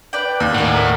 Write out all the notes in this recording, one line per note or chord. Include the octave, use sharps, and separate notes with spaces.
B4 D5 G5
D#2
A2 A#3 F#5 G#5
A#4 B6 D#7